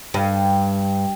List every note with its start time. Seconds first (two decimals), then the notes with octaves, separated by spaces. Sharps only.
0.14 G2